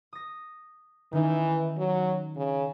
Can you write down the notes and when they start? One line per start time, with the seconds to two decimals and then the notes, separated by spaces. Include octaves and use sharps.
0.13 D#6 A#6
1.13 D#3 E3 C#4 D#4
1.78 F#3
2.37 C#3